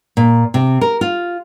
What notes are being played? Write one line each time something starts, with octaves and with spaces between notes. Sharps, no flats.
A#2
C3
A#4
F4